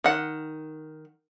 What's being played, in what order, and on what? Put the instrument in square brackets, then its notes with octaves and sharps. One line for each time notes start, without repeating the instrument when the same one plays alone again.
[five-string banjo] D#3 F#5